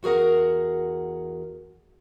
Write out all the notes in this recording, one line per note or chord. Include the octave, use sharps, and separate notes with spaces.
E2 F#4 G#4 A#4 F#5